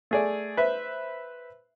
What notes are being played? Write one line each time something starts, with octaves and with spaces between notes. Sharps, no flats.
A3 G#4 D5
B4 C5 E5